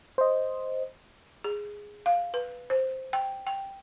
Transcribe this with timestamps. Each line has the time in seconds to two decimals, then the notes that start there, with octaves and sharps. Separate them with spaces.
0.18 C5 D#5
1.44 G#4
2.06 F5
2.34 B4
2.70 C5
3.13 G5
3.47 G5